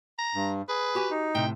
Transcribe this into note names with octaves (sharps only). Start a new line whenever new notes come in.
A#5
G2
G#4 B4
F#4 G4 G#5
D#4
A2 C3 G5